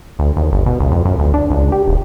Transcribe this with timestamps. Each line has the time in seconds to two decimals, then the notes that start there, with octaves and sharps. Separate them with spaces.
0.19 D2
0.37 D#2
0.52 G1
0.66 B2
0.80 C#2
0.92 F2
1.05 F#2
1.19 D2
1.34 D4
1.50 C#2
1.72 G4
1.88 D#1